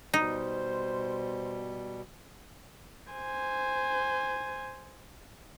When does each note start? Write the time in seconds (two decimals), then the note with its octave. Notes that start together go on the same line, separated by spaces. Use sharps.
0.14 B2 G3 D#4 C5
3.13 C5 G#5